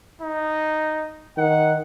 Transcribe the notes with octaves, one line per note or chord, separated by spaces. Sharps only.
D#4
D#3 F#5